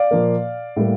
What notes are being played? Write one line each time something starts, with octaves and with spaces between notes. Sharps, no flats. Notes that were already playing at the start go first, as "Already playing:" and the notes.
Already playing: D5 F5
A#2 F3 A#3
A2 G3 A#3